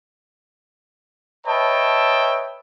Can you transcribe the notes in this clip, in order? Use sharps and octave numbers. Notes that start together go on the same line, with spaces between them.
B4 C#5 D#5 E5 G5 A5